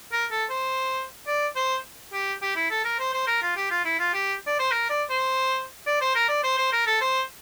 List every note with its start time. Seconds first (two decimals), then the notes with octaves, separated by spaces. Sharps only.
0.12 A#4
0.31 A4
0.50 C5
1.27 D5
1.56 C5
2.13 G4
2.42 G4
2.56 E4
2.71 A4
2.85 A#4
2.99 C5
3.13 C5
3.27 A#4
3.42 F4
3.57 G4
3.71 F4
3.85 E4
4.00 F4
4.14 G4
4.47 D5
4.59 C5
4.71 A#4
4.90 D5
5.10 C5
5.87 D5
6.01 C5
6.15 A#4
6.29 D5
6.44 C5
6.58 C5
6.73 A#4
6.87 A4
7.01 C5